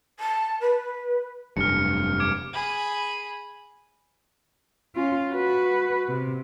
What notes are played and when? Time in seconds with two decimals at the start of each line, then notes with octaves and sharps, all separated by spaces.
0.19 A5
0.60 B4
1.57 F1 G2 F6 C#7
2.20 D6 G#6 D7
2.53 G#4 B5
4.95 C#4 F4
5.31 F#4 B4
6.09 C3